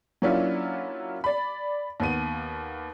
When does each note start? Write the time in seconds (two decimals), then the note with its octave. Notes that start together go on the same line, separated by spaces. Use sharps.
0.22 F#3 A#3 C#4 D4 E4 F4
1.24 D5 B5
2.00 D#2 B3 D#7